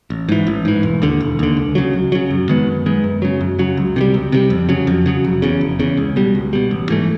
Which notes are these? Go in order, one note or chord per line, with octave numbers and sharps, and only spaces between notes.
A1
G#2 E3
A1
G#2 E3
E1
D#2 D3
E1
D#2 D3
C#2
C#3 F#3
C#2
C#3 F#3
F#2
D#3 G#3 B3
F#2
D#3 G#3 B3
F#2
C#3 F#3
F#2
C#3 F#3
C#2
C3 D#3 G3
C#2
C3 D#3 G3
F2
C#3 F#3
F2
C#3 F#3
F1
E2 C#3
F1
E2 C#3
C#2
B2 G3
C#2
B2 G3
A1
G#2 E3 A3